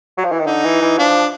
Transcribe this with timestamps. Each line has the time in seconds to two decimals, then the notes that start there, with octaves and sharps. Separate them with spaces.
0.18 F#3
0.24 F3
0.32 E3
0.39 D#3
0.46 D3 D#4
0.64 E3
0.82 E3
0.99 F3 D4